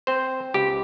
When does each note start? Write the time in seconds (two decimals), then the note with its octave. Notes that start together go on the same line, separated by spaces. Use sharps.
0.07 C4 C5
0.54 C#2 G4